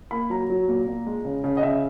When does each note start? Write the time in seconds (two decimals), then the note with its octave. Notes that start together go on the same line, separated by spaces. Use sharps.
0.11 A#3 B5
0.30 F#3 A#5
0.50 F#3
0.68 A#2
0.88 A#2
1.07 G#3
1.25 C#3
1.44 C#3
1.57 D#5
1.63 C#3 E5